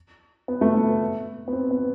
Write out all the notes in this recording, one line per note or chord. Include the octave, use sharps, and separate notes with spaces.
B3
A3
B3
B3
C4
B3